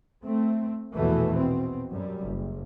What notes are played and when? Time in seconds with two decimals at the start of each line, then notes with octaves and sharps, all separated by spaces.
0.24 A3 C4
0.93 A#1 E2 B2 E3 A3
1.33 B2 C4
1.89 F#2 G3
2.22 F#1